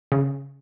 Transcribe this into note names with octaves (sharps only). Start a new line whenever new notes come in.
C#3